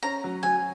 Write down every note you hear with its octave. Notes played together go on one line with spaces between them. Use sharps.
C#4 A#5
F#3
F#3 G#5